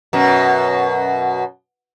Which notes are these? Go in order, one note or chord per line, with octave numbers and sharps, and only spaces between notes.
F#2 B2